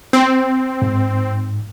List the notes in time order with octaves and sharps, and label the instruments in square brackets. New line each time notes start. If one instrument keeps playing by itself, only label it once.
[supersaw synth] C4
[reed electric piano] G#2